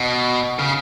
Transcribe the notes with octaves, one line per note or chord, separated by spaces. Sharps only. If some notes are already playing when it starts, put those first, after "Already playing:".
Already playing: B2
C#3